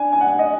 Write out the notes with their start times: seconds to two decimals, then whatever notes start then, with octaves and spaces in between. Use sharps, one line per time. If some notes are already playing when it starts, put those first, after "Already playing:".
Already playing: D4 G#5
0.13 G#5
0.21 F#5
0.36 D4 D#5